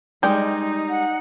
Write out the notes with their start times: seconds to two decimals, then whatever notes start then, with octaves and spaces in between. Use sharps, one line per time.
0.23 G3 G#3 D#4 G4
0.89 F#5